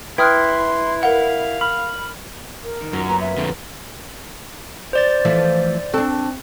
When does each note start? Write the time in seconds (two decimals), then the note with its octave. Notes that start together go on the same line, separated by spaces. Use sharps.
0.18 E4 B4 G5 C6 D#6 F6 F#6
1.03 A#4 F5 F#5
1.61 B5 F6
2.64 A#4
2.81 D#3
2.93 F#2 F#3 F4 C#5
3.08 A#3 B3 A#5
3.20 E5
3.38 F2 D3
4.93 C5 D5 A6
5.25 E3 F3 A3
5.94 C4 D4 A4